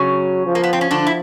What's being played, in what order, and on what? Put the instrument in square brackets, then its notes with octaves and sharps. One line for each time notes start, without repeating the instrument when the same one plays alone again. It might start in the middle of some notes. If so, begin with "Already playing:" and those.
Already playing: [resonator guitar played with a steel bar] C#3 C#4 [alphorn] F#3
[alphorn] F3
[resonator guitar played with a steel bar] A#3
B3
C4
C#4
[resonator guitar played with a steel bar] D3 D4 [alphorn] F3
[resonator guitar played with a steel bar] E4